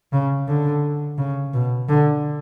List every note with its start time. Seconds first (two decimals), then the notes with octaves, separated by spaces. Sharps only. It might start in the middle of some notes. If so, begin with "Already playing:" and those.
0.13 C#3
0.48 D3
1.18 C#3
1.54 B2
1.89 D3